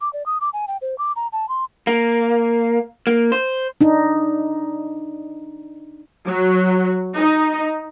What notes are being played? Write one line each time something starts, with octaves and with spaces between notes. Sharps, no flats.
D6
D5
D#6
D6
G#5
G5
C5
D6
A#5
A5
C6
A#3
A#3
C5
D4 D#4
F#3
D#4